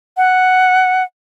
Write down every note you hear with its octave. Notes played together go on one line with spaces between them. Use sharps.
F#5